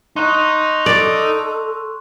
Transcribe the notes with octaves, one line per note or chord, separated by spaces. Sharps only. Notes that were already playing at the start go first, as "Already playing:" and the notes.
D#4 D#5 C6 C#6 F#6
A4 D5